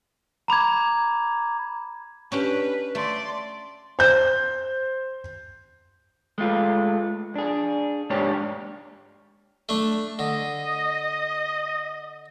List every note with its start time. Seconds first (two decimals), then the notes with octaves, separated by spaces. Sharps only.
0.48 A#5 B5 D6 G#6
2.32 C#4 D4 G4 B4
2.95 A3 D5 C6
3.99 C5 G6
6.38 G#3 A3 F4
7.36 D4 G#4
8.10 G#2 A#3 D4 G4 C#5
9.69 A3 D4
10.19 D3 D#5